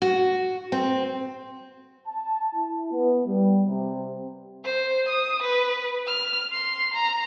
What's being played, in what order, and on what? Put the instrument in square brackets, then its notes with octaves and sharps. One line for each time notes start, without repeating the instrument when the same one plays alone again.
[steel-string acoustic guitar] F#4
C4
[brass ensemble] A5
E4
B3
G3
C3
[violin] C5
D#6
B4
F6
C6
A#5